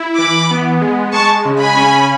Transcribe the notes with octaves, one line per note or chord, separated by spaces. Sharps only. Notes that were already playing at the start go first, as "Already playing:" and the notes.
Already playing: E4
E3 B5 D6
B3
G#3
G#3 A5 C#6
C#3
G#5 B5
C#4